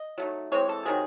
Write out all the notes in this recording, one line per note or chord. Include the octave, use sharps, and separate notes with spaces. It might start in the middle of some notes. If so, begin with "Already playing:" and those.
Already playing: D#5
F#3 A3 D#4
E3 G#3 C4 C#5
A4
C3 D#3 F#3 G#4